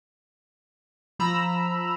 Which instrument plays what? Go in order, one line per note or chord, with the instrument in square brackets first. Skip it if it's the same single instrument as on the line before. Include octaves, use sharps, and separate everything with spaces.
[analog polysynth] F3 A#5 B5 E6